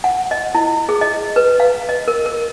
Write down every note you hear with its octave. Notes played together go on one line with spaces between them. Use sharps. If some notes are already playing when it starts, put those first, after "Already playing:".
F#5
D#5
E4
G#4
D#5
B4
F5
D#5
A#4
A#4